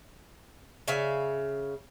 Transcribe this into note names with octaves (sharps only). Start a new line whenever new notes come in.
C#3 E5 F5